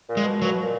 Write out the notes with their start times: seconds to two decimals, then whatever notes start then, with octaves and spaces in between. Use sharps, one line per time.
0.09 A#2
0.17 G#3
0.25 B2
0.42 A#2 F#3
0.52 B2
0.63 A#2